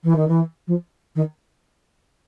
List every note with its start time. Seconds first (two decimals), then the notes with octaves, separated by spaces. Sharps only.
0.04 E3
0.16 D#3
0.28 E3
0.67 F3
1.15 D#3